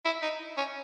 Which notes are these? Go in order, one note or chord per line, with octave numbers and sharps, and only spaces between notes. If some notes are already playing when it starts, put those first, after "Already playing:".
E4
D#4
C#4